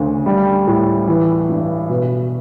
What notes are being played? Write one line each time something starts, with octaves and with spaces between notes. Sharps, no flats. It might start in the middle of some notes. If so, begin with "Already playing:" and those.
Already playing: D2 C#3
G3
A2
E3
G2
B2